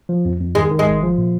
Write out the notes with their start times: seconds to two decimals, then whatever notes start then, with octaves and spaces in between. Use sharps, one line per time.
0.09 F3
0.25 F2
0.40 F2
0.55 D#3 G#3
0.71 D#3
0.79 G#3
0.87 G#1
1.02 F3
1.18 A#2